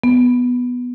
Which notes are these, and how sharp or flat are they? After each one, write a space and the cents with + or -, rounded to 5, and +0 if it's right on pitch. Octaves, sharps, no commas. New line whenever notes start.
B3 +0